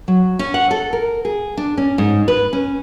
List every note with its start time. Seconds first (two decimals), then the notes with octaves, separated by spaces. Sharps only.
0.08 F#3
0.39 C#4
0.54 F#5
0.71 A4
0.93 A#4
1.25 G#4
1.57 D4
1.78 C#4
1.98 G#2
2.28 B4
2.53 C#4